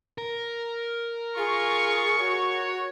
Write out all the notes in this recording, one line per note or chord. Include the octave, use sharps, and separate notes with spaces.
A#4
F4 G#4 C#6
F#4 C#5